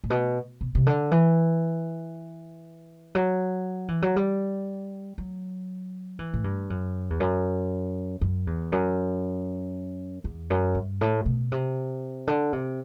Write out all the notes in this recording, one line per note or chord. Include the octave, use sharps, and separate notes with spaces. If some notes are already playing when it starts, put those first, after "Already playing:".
A2
B2
B2
C3
D3
E3
F#3
E3
F#3
G3
F#3
E3
A2
G2
F#2
E2
F#2
F#2
E2
F#2
E2
F#2
G2
A2
B2
C3
D3
C3